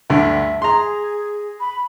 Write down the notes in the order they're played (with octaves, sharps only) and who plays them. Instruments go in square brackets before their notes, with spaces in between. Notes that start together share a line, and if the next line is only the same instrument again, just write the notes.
[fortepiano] D2 G2 D3 [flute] E5
[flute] G#4 [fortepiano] A#5 C6
[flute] B5